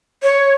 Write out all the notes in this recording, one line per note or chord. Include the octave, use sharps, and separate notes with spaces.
C#5